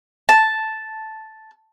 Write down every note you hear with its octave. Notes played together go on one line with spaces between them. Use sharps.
A5